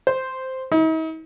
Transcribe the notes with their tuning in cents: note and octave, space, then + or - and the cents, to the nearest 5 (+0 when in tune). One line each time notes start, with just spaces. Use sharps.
C5 -5
D#4 +45